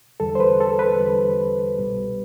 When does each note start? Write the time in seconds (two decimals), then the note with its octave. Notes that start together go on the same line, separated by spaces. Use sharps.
0.20 E2 D3 G3 A4
0.35 C5
0.40 B4
0.60 A4
0.79 B4
0.99 E2 D3 G3
1.78 C2 B2 G3